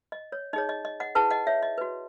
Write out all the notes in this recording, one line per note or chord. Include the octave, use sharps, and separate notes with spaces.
D#5
C#5
D#4 G#4 C#5 D#5
D#5
D#5
D#5 F#5
E4 G#4 B4 F#5 A5
D#5 F#5
C#5 E5
D#5
F#4 B4